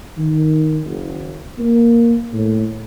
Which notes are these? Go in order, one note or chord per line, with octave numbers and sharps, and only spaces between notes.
D#3
F#1
A#3
A2